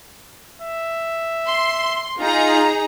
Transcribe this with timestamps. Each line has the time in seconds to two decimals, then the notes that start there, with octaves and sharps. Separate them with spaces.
0.62 E5
1.48 C6
2.19 D#4 F4 G#4 A#5